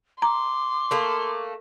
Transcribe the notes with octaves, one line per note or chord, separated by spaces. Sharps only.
A#5 C6 D6
A3 A#3